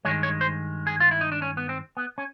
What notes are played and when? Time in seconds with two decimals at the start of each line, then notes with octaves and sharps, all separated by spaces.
0.05 G2 D#3 G#3 C#5
0.23 C#5
0.41 C5
0.87 G#4
1.00 F4
1.11 E4
1.21 D#4
1.32 D4
1.42 C#4
1.57 B3
1.69 C4
1.97 B3
2.18 C#4